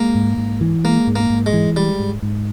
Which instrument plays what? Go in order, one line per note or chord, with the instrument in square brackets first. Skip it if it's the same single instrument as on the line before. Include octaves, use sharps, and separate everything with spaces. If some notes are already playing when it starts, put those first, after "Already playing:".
Already playing: [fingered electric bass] G#3 [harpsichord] A#3
[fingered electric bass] G#2
G#2
E3
[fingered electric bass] G#3 [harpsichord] A#3
[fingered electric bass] G#2
[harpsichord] A#3
[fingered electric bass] G#2
[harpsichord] G#3
[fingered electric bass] E3
[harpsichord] G3 [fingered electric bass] G#3
[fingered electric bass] G#2
G#2